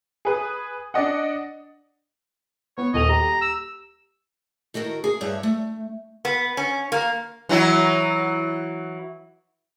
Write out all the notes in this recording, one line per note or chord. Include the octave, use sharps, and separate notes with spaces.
G#4 B4 D#6
D4 D5 D#5 F#5
B3 C#5
D#1 A4 D#5 F7
G4 A#5
E6
D#3 F#4 A4 A#4
G#4
G2 C#5 E5 A5
A3
B3
C#4
A#3
E3 F#3 E4